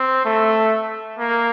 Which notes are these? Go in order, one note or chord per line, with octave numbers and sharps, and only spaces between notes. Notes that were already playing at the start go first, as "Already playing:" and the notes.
Already playing: C4
A3
A#3